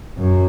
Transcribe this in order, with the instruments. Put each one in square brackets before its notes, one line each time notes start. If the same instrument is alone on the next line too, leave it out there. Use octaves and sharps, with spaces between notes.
[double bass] F#2